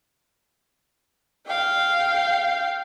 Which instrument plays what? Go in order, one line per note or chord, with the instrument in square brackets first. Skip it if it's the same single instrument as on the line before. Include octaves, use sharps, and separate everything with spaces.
[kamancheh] F5 G5